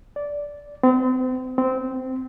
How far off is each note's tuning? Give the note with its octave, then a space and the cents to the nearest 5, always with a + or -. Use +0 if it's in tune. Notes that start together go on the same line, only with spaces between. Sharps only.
D5 -10
C4 -35
C4 -15